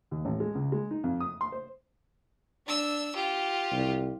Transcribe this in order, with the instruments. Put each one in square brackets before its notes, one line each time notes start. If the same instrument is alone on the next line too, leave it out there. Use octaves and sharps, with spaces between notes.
[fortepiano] D#2
A1
G#3
C#2
G#3
D#4
F2
D#6
C6
C5
[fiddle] D4 E6
F4 G4
[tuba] C2